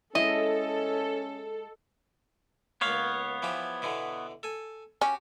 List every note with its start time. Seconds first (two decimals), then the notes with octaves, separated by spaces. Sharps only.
0.15 G#3 C#4 E4 A4 D#5
2.81 C#2 A#3 B3 C#5 F5 B5
3.42 E3 F3 G4
3.82 B2 D3 E3
4.43 A4 G#5
5.01 C#4 F#4 G4